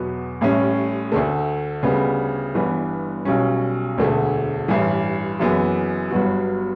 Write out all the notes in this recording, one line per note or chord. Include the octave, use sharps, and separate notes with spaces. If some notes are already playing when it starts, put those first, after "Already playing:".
Already playing: E2 B2 F#3 B3
A1 A2 G3 C#4
D2 D3 A3
D2 C#3 G3 B3 D4
G1 G2 E3 B3 D4
B1 B2 G3 C#4
E1 D2 D3 A3
A1 G2 E3
F#1 F#2 E3 B3
G1 G2 F#3 B3 F#4